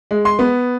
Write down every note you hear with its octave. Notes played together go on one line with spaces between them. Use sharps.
G#3
C6
B3